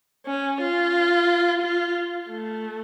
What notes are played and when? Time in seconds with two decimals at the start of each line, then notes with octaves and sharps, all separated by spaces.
0.26 C#4
0.61 F4
1.62 F4
2.30 A3